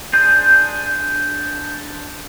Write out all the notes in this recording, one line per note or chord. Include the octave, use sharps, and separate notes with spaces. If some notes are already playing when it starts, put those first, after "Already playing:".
D4 G#4 C5